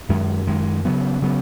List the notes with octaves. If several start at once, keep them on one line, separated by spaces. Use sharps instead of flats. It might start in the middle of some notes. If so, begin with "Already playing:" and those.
F#2 D#3 G#3
F#2 D#3 G#3
C#3 F#3 B3
C#3 F#3 B3